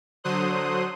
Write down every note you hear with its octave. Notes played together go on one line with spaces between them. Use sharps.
D3 F#3 C5 C6 D#6 F#6